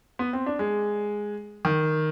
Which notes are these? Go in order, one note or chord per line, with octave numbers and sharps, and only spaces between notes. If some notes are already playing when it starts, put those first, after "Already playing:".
B3
C4
D4
G#3
D#3